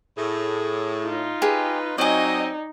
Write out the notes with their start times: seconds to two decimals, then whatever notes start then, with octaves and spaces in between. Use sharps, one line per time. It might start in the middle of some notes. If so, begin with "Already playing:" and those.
0.17 A2 G#4
1.05 D#4 F4
1.42 G4 G#4 B4
1.98 F#3 C4 D#4 D5 D#5 G#5